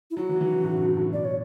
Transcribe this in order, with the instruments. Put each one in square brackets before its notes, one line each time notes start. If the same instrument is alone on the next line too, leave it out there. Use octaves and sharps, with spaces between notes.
[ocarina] E4
[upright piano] F#3 [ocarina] F#4
[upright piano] E3
F#3
E3
C#3
A2
F#2
G2
A2
[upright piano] B2 [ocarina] D5
[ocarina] C#5